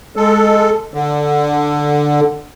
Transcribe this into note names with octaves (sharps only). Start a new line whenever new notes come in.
G#3 A4
D3